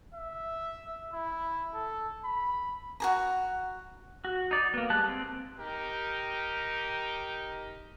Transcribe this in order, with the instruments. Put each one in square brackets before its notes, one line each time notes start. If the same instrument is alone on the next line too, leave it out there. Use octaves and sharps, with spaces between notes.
[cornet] E5
E4
A4
B5
[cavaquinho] F#4 G#4 A#5
[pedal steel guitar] F#4
D#4 D5
A#3 B3
G3 G#3 A5 F#6
C4
[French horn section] D#4 G4 [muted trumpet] A#4